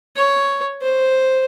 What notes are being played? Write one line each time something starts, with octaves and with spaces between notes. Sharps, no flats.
C#5
C5